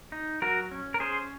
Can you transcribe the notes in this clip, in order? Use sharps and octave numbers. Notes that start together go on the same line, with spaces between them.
D#4
F#3 F#4 A#4
C#4
A#4
C#4 G#4 C5